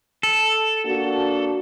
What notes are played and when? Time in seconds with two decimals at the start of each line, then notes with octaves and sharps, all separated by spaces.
0.23 A4
0.85 A#3 D4 F#4